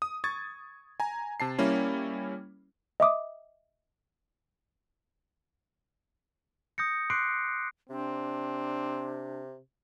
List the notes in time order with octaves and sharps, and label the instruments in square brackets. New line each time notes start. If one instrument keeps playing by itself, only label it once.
[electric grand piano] D#6
C#6 D#6 G#6 A6
G#5 A#5
C3 A5 C7
G3 A#3 C#4 E4
[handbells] D#5 E5 D6 D#6
[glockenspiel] D#6 G6 A#6 C#7
C6 D6 F#6 C7 D7
[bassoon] C3 [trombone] C4 [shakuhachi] D4